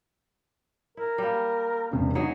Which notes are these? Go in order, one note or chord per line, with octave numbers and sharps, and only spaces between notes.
E4 A#4
G3 A#3
E1 C3 C#4
F#3 D#4 G#4 D#5